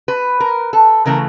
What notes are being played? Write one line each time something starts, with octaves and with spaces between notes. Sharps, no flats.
B4
A#4
A4
C#3 E3 A3 A#4